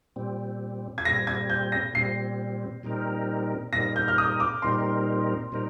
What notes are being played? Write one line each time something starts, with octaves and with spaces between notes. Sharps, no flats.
A#2 G3 C4
G#6
A#2 G3 C4 A#6
G#6
G6
A#6
A#2 G3 C4 C7
A#2 G3 C4 D#4 A#4
A#2 G3 C4 D#4 A#4 A#6
G6
F6
D#6
D6
A#2 G3 C4 D#4 A#4 C6
A#2 G3 C4 D#4 A#4